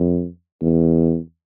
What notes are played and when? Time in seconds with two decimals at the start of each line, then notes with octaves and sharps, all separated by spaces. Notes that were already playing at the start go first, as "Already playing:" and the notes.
Already playing: F2
0.62 E2